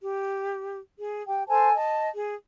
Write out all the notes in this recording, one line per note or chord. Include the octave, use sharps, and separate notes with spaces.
G4
G#4
G4 G5
A4 C5 G#5 A5
D#5 A5
G#4